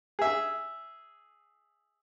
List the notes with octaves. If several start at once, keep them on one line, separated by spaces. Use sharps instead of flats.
G#4 E5